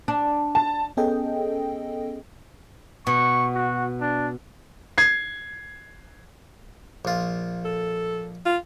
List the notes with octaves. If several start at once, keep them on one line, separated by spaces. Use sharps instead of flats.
D4
A5
B3 C#4 G#4 A4 D#5 G5
B2 C#6
F#4
D4
G#6 C7
A#1 F4
A4
F4